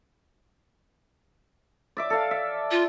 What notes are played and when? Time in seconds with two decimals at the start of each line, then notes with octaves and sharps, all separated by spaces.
1.97 D5 E5 D6
2.10 A4 F5
2.31 E5
2.71 F4